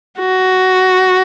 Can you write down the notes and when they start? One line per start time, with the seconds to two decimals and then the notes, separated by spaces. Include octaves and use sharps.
0.19 F#4